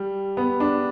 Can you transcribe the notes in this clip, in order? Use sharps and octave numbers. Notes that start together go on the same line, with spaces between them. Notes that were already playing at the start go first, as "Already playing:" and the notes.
Already playing: G3
B3
D4